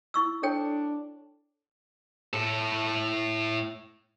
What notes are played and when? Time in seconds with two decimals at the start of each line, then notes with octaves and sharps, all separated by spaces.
0.14 E4 C#6 E6
0.43 D4 A4 C#5 G5
2.34 A2 A4